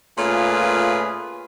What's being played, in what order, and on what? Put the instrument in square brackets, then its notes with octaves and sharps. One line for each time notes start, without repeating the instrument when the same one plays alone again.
[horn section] A#2 A3 C#4 F4 G#4 B4